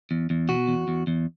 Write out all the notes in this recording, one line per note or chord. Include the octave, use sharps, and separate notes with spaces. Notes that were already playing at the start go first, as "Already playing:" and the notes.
E2
E2
B2 F#4
E2
E2
E2